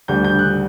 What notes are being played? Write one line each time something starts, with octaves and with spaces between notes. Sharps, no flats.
D2 D3 G3 G6
G6
F#6